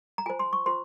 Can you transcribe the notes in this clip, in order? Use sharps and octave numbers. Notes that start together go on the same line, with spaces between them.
A#5
F4 C5 G#5
C6
C#6
F4 C5 C6